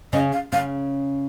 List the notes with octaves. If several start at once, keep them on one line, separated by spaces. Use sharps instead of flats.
C#3 C#4 D#5
F5
C#3 C#4 F5